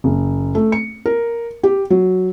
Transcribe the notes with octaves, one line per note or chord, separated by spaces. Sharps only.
F#1
A3
C#7
A#4
G4
F#3